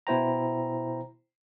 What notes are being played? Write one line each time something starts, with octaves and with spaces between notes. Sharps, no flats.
B2 B3 E4 C5 G5 A#5